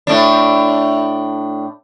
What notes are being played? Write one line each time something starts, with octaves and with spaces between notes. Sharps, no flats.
A2 D4